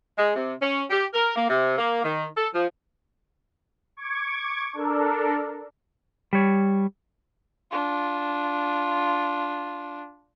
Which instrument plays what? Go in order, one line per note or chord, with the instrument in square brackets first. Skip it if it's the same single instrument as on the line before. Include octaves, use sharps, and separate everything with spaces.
[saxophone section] G#3
C3
C#4
G4
A#4
A#3
C3
A#3
D#3
A4
F3
[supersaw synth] C#6 D6 G#6
D4 A4 A#4
[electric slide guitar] G3 C#5
[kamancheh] D4 F4